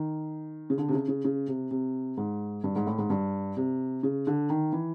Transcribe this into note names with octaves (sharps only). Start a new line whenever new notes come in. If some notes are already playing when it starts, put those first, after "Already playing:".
Already playing: D#3
C#3
D3
C3
C#3
C#3
C#3
C3
C3
G#2
G2
G#2
A2
G#2
G2
C3
C#3
D3
D#3
E3